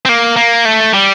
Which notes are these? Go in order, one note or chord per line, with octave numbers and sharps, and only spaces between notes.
C4
A#3
A#3
A3
G3